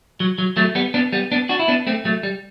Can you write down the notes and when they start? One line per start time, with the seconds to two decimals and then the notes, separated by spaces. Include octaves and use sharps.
0.20 F#3
0.38 F#3
0.57 F#3 A3
0.75 G3 B3
0.94 B3 D4
1.13 G3 B3
1.32 B3 D4
1.49 D4 F#4
1.59 E4
1.68 B3 D4
1.87 A3 C4
2.05 F#3 A3
2.23 G3